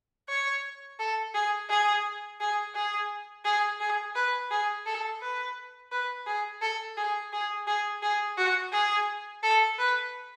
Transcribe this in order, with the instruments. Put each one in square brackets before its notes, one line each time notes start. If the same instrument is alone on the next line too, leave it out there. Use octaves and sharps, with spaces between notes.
[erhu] C#5
A4
G#4
G#4
G#4
G#4
G#4
G#4
B4
G#4
A4
B4
B4
G#4
A4
G#4
G#4
G#4
G#4
F#4
G#4
A4
B4